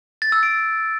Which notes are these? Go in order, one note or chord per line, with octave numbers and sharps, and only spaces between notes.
A6
E6
D7